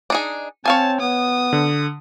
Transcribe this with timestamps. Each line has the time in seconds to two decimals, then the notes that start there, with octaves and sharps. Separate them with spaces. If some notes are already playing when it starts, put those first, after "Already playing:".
0.10 D4 D#4 G#4
0.66 C4 C#5 F5 G#5 A5
1.00 B3 D#6
1.53 D3